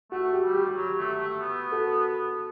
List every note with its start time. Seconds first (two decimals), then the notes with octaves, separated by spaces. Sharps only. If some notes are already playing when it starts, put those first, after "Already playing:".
0.12 A3 F#4
0.33 G4
0.44 G3
0.55 G4
0.76 F#3
0.98 A3
1.19 A3
1.40 B3
1.72 F#4 A4